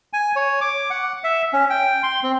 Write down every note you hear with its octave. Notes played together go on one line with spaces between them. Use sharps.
G#5
C#5
D6
F#5
E5
C#4
G5
C6
C4